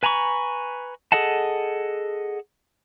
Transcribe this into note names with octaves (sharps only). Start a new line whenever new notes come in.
B4 G#5 A#5 B5 C#6
G#4 A4 D#5 F#5 A5